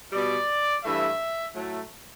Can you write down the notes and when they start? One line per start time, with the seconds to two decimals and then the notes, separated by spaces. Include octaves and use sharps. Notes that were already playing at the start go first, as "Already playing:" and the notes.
0.12 B2 G3 D5
0.83 G2 E3 A3 E5
1.55 A2 F#3 A3